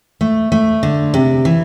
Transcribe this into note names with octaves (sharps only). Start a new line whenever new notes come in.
A3
A3
D3
C3
E3